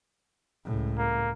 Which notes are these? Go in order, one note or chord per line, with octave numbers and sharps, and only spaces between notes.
C#2 A2
A#3